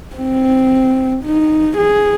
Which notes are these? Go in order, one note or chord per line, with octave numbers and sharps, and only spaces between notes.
C4
D#4
G#4